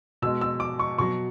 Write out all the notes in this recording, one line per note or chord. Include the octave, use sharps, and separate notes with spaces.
B2 G#3 E6
E6
D6
C#6
B2 F#3 C#6